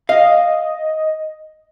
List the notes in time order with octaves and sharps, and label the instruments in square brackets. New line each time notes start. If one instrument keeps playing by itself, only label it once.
[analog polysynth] D#5 [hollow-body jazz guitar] F5